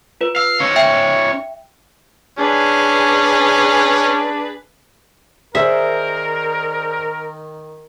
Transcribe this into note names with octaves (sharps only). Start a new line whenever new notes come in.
F4 B4
F5 E6
C#4 D#4 C#5
E5 G5
C#4 D4 G#4 B4
D#3 G#4 A#4 C5 D5 E5